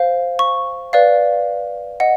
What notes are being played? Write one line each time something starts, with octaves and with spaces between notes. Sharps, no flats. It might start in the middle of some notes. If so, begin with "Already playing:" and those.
Already playing: C5 F5
C#6
B4 D5 F5
D#5 F#5